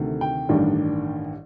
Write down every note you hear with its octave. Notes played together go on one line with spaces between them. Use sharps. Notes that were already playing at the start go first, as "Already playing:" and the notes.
Already playing: D2 C3 D#3 A3
G5
A1 G2 D#3 G3 D4